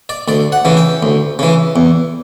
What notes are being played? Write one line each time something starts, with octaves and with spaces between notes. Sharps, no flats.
D5
D2 D5
F#5
C#3 E3
G5
D2
C#3 E3
E2